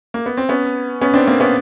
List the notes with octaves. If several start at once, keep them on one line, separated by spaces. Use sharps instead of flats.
A#3
B3
C4
B3 C#4
B3 C#4
C4 D4
A#3 C4
B3 C#4